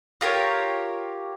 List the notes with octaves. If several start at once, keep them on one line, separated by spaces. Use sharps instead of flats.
F4 G4 A#4 C#5